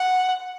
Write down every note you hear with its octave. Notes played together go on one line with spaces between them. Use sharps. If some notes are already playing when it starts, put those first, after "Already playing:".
Already playing: F#5